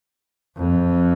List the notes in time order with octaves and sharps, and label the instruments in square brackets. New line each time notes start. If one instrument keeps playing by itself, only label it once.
[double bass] F2